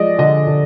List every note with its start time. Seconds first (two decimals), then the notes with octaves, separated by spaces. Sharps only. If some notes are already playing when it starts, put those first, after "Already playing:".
Already playing: F3 G#3 D5 D#5
0.19 D3 D#5
0.47 D3